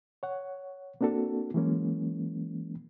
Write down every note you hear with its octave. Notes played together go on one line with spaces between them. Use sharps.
C#5 F#5
A#3 C4 D4 F#4 A4
E3 F#3 G#3 A#3 C#4